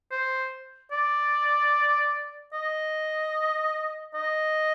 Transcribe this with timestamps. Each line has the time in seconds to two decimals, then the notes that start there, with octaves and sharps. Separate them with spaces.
0.12 C5
0.92 D5
2.53 D#5
4.14 D#5